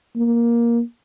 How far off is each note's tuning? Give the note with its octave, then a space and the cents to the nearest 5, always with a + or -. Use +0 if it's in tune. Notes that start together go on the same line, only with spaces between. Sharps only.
A#3 +10